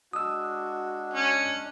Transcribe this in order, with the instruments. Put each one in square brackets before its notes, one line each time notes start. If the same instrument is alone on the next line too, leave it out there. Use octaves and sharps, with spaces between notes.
[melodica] G#3 D4 [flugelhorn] F#4 [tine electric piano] D#6 E6
[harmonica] C#4